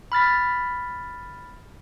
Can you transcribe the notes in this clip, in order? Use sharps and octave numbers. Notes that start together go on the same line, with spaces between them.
B5 F6 A6 B6